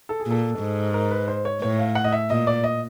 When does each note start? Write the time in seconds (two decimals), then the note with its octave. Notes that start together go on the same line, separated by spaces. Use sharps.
0.09 A4
0.20 G#4
0.26 A#2 A4
0.59 G#2
0.94 A#4
1.11 B4
1.28 C5
1.45 C#5
1.62 A2 C#5
1.79 F5
1.95 F#5
2.04 D#5
2.12 E5
2.30 A#2 D#5
2.47 D5
2.64 D#5